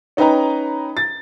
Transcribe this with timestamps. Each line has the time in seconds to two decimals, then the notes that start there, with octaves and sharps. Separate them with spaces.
0.17 C#4 D#4 B4 G5 A#5
0.97 A6